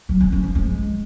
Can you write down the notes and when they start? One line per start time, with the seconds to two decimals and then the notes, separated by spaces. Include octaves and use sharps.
0.09 F#3
0.20 C4
0.32 C#4
0.44 F3
0.55 G#3